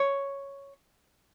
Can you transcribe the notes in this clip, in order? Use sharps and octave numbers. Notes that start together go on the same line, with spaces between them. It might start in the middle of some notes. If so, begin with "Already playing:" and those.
Already playing: C#5